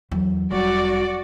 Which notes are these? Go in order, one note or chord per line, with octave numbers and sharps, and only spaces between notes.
E2 F#3
F1 G3 F#4 D5